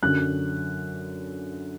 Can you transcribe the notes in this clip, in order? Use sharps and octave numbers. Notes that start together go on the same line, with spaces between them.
F#2 D3 F#3 F#6